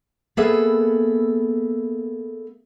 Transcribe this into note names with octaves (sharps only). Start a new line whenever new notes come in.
A#3 B3 G#4 A4 B4 E5